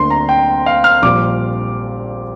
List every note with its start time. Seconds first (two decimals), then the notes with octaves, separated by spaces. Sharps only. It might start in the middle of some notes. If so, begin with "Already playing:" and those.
Already playing: D2 D3 A#3 C6
0.10 A#5
0.29 G5
0.66 F5
0.84 F6
1.02 A#1 A#2 G3 D6